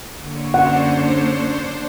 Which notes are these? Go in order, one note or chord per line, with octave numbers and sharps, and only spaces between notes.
D3 A#3 C#5
F#2 D4 F#4 C5 F#5